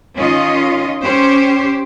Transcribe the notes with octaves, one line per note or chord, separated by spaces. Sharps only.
D#3 C#4 F4 D#5
C#4 G4 C5